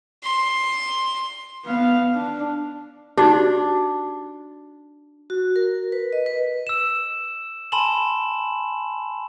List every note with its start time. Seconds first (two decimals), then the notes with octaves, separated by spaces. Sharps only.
0.24 C6
1.65 B3 F5
2.15 D4
3.18 D4 D#4 F#4 G4
5.30 F#4
5.56 A#4
5.92 B4
6.13 D#5
6.26 B4
6.67 E6 E7
7.72 G#5 A5 B5 C6 E7 F#7